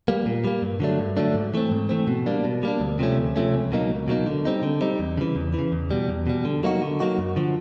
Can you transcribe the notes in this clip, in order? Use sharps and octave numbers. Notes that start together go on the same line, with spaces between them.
G3 A#3
A#2
G3 A#3
G2
D3 F#3 A3 D4
G2
D3 F#3 A3 D4
G#2
E3 A3 C4
G#2
E3 A3 C4
B2
G3 A#3 D4
B2
G3 A#3 D4
D2
C3 F3 A3 C#4
D2
C3 F3 A3 C#4
C#2
B2 F#3 A#3 D#4
C#2
B2 F#3 A#3 D#4
D3
G3 C4 D#4
D3
G3 C4 D#4
E2
C#3 E3
E2
C#3 E3
E2
B2 G3
E2
B2 G3
D3
F#3 A#3 D#4 F#4
D3
F#3 A#3 D#4 F#4
F#2
D3 F3